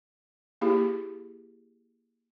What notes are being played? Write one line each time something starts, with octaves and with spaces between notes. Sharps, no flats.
A#3 E4 G4 G#4